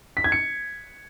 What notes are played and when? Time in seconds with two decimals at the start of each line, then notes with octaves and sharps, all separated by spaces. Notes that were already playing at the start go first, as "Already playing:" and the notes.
0.17 B6
0.24 G#6
0.32 C#7